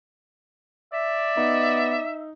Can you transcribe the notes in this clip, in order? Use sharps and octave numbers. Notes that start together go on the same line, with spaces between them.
D5 E5
B3 D#4